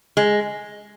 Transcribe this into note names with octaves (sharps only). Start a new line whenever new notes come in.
G#3